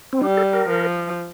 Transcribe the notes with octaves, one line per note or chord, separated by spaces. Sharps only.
C4
G3 D4
A4
A#4
F3